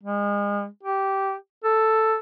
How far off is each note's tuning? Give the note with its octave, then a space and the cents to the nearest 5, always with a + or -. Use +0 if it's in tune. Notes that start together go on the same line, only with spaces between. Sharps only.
G#3 -35
G4 -15
A4 +5